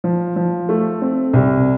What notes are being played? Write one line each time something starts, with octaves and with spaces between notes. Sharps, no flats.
F3
F3
A3
C4
C2